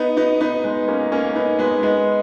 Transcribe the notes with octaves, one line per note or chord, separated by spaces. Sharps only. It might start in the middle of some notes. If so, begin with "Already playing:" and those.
Already playing: B3 D#4
B3 D#4
B3 D#4
G#3 B3
A#3 C#4
A#3 C#4
B3 D#4
G#3 B3
G#3 B3